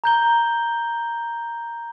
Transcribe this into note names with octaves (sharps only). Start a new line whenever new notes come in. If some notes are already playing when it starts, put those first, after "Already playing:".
A#5 G6 G7